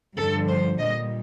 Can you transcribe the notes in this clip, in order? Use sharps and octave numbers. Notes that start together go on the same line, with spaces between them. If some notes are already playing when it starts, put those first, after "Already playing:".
G2 D3 F3 A4
C5
A#2 G3 D#5